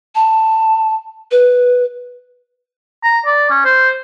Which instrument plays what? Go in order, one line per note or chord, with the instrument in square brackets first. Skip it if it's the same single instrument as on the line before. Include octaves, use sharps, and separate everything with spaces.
[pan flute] A5
B4
[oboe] A#5
D5
C#4
C5